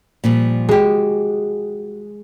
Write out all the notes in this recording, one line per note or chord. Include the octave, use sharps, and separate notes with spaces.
A#2 F3 G3
G#3 F#4 G4